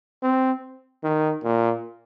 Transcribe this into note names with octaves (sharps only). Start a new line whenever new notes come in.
C4
D#3
A#2